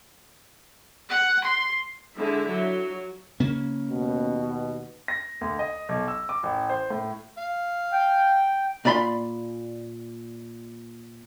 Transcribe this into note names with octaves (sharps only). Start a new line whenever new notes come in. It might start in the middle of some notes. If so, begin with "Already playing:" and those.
F#5
C6
D3 G#3 E4 E5
F#3
C#3 A#3 C#4
D#2 B2
A#6
D2
D#5
B1
E6
D6
A1
C5
A2
F5
G5
A#2 D5 B5 C6